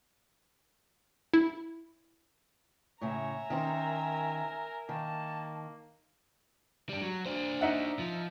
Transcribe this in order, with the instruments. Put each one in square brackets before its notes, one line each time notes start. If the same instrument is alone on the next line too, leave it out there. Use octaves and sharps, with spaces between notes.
[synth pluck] E4
[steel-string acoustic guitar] A2 C#3 [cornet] C#5 [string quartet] E5 G#5 A#5
[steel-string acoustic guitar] D#3 C#4 C5 [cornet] A#4
[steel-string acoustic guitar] D#3 [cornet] A#3 [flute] A5
[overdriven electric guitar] G3 D4
F#3
D4 C5
[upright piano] D#4 E5 F#5
[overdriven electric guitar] F3